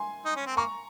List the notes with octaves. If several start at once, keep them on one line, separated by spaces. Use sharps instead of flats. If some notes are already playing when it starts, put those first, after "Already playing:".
Already playing: G#5 C6
D#4
C#4
C4
A#3 A#5 C#6